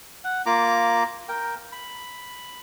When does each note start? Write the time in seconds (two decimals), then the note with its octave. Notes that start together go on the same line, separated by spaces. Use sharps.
0.24 F#5
0.46 A#3 F4 A#5 D6
1.29 A#4 G5
1.72 B5